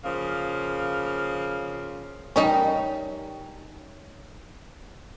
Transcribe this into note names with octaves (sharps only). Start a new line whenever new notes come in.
C#3 F3 A#3
G3 C#4 D#4 A#4 D#5